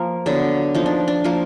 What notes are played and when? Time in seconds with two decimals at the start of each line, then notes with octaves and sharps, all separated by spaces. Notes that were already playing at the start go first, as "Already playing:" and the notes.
Already playing: F3 A#3 A#4
0.26 D3 F#3 B3
0.75 F3 A#3 D#4
0.86 D4
1.08 D4
1.24 F3 A#3